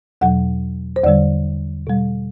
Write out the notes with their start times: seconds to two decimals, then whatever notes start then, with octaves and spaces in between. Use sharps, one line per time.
0.21 E2 B2 F#3 F#5
0.96 C5
1.04 E2 D3 G3 D5
1.87 B2 G3